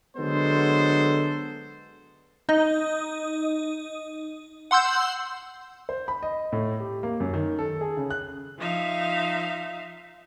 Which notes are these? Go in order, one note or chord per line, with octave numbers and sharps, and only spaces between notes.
D3 F#3 G#3 B3 A4 C5
D#4 D#5
F#5 C6 E6 G6
C5
B5
D#5
A2
G4
A#3
F#2
D#3
A4
G#4
C#3
F#6
F3 D#4 E5 F5